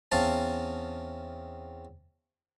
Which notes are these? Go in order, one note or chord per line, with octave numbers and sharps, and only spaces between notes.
E2 C4 C#4 F5 A5